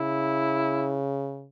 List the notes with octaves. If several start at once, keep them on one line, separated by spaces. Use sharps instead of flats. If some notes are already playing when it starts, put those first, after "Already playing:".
Already playing: C#3 E4